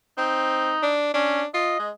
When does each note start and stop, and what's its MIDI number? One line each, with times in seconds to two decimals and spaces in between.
0.18 0.73 60
0.18 0.92 63
0.83 1.11 62
1.14 1.42 61
1.14 1.46 62
1.54 1.78 65
1.54 1.90 75
1.79 1.91 56